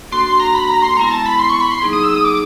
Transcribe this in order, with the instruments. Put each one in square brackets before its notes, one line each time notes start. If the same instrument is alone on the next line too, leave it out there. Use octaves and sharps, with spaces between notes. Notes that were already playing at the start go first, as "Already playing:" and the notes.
[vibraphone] A#3 D4 F#4 A4 [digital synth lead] C6
[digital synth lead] C6
A#5
B5
A#5
C6
[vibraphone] G#3 B3 E4 [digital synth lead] A#5
[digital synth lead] A#5
A5
B5
C6
C#6
B5
C6
[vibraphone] F#3 A#3 D#4 G#4
[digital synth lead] D#6
E6
D#6
D6